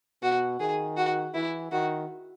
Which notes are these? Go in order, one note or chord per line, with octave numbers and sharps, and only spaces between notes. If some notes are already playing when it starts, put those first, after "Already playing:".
B2 F#4
D#3 G#4
F#4
E3 E4
D#3 F#4